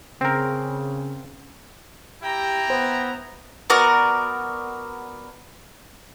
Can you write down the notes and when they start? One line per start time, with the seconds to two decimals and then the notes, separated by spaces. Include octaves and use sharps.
0.21 C#3 C4 A#4
2.23 E4 G4 G5 A#5
2.70 B3 C5
3.70 B3 F#4 A#4 D5